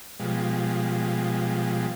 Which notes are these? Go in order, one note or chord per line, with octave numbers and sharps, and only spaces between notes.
B2 F3 G3 G#3